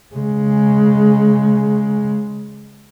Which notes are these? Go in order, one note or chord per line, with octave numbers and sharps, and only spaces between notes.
C#3 G#3